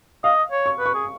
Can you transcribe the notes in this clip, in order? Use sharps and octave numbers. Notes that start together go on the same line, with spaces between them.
D#5 F5
C#5
C#6
B4
C#6
G#4